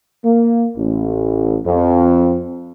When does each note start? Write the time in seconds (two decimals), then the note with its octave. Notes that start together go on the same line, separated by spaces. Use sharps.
0.24 A#3
0.77 A1
1.65 F2